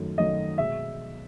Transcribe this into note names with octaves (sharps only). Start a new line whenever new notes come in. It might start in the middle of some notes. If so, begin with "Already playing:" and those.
Already playing: F#2 D#3 F#3 A3
F#2 D#3 F#3 A3 D#5
B2 G#3 E5